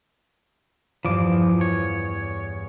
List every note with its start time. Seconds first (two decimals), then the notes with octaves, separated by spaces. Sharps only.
1.05 E2 G2 F3 D6
1.61 C#5